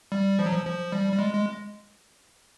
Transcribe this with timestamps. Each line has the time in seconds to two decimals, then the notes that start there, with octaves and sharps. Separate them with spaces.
0.12 G3
0.39 F3
0.46 F#3
0.53 F3
0.66 F3
0.92 G3
1.13 G3
1.19 G#3
1.34 G#3